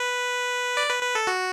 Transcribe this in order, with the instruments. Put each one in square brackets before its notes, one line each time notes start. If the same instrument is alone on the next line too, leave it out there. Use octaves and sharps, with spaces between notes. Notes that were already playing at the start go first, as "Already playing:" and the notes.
Already playing: [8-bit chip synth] B4
D5
B4
B4
A4
F#4